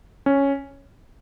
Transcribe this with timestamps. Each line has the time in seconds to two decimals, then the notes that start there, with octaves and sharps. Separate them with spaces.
0.26 C#4